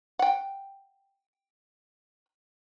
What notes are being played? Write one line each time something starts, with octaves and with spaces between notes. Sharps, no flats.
F#5 G5